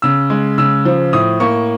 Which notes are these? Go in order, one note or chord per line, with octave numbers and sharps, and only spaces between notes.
C#3 E6
G#3
C#3 E6
F3
A2 D#6
A#3 C#6